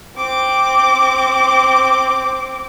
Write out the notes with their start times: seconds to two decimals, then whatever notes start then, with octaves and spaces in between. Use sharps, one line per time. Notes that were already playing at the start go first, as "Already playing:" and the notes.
0.17 C4 D6